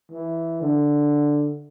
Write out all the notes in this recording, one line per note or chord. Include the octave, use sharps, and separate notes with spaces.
E3
D3